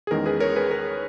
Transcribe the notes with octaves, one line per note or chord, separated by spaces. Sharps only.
G#4
E2 D#3 G#3 C#4 A#4
G#4 B4
A#4 C#5
G#4 B4
A#4